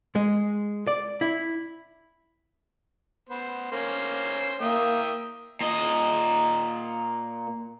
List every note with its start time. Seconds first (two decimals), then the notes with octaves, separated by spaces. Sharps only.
0.15 G#3
0.87 D5
1.21 E4
3.29 B3 C5
3.72 A#3 C#4 C5
4.61 A#3 E5 G5 D#6
5.61 A#2 D#5